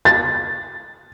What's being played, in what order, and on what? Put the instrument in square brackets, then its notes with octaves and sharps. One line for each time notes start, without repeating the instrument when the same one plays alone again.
[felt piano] A6